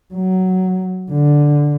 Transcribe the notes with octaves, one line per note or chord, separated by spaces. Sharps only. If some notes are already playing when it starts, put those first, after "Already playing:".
F#3
D3